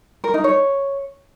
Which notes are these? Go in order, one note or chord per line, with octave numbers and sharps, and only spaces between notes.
A#4
D#4
C#5